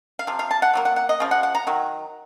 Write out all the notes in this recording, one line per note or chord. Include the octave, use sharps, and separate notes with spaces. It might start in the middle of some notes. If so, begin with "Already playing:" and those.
F5
C3 F3
F5
A5
F#5
C3 F#3 A#3
F#5
F#5
D#5
C#3 F3
F#5
F#5
A#5
D#3 F#3